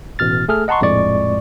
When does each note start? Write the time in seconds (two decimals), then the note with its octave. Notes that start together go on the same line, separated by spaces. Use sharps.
0.19 A1 B2 F6 A6
0.48 A3 G#4 A4 F6
0.68 D#5 F#5 A5 A#5 C6 C#6
0.81 A#1 F2 A2 G#3 D5 C#6